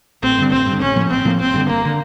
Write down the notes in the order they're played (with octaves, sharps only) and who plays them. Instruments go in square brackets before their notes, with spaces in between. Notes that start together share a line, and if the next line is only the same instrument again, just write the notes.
[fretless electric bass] A1 [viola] C4
[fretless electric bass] G2 D3
[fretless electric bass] A1 [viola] C4
[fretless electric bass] G2
D3
[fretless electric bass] A1 [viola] C#4
[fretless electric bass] A2 F3 A#3
[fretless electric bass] A1 [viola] C4
[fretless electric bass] A2 F3 A#3
[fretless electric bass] G1 [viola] C4
[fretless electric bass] G2 D3
[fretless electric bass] G1 [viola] A#3
[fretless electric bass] D3